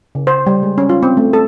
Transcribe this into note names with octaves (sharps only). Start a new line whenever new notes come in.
C#3
C5
G3
G#3
C#4
F4
C4
A3
A4